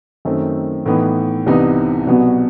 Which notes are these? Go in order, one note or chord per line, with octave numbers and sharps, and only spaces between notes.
F#2 D#3 A3 C4
A2 E3 B3 D#4
C2 C3 E3 B3 D#4
C2 B2 F#3 B3